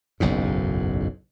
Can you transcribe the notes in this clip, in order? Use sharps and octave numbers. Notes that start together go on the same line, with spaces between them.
F#1 B1 E2 G#2